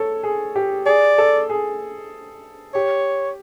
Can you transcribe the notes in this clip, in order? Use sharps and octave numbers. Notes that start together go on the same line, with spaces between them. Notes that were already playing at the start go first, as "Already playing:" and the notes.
Already playing: A4 C#5
G#4
G4
G#4 D5
A4
G#4
G4 C#5